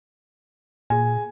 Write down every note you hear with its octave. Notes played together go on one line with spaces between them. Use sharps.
A#2 G#4 G#5